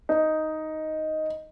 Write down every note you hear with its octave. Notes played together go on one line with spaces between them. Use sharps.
D#4